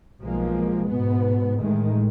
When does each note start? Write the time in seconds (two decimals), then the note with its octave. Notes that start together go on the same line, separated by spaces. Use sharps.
0.21 B1 F3 G#3 A#3
0.89 G#2 B2 B3
1.60 A1 A2 D#3 G#3 A3